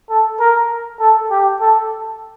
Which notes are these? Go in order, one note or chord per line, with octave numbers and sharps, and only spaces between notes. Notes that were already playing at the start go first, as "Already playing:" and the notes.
A4
A#4
A4
G4
A4